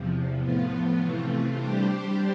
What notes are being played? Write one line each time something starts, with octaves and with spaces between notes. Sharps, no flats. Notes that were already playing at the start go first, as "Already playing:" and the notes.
Already playing: E2 C3 F3
A2 F3 B3 F4
C3 E3 A3 C4 F4
G3 D4 G4 C5